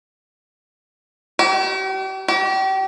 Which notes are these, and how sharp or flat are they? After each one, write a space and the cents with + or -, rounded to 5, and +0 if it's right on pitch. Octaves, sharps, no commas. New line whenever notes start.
G4 -40
G4 -35